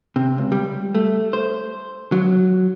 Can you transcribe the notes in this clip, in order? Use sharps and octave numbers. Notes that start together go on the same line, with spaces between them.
C3
C#2
G3
A3
C5
F#3